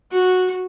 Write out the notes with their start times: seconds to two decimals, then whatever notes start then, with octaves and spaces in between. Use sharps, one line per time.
0.11 F#4